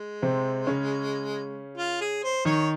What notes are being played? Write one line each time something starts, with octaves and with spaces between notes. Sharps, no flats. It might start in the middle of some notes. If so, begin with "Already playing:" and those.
Already playing: G#3
C3 C4
C#3 C#4
F4
G#4
C5
D#3 D#4 C#5